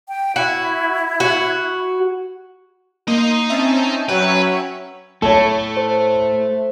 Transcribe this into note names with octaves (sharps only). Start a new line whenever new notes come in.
G5
E4 F#4
F#4
A#3 D#4 D#5 C6
C4 C#4 E5 A5
F#3 C#4 B4 C#5 E5 G5
A2 A3 A4 C#5
C5